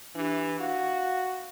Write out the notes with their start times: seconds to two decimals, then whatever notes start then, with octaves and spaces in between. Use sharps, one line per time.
0.15 E3 D4 G4
0.60 F#4 F5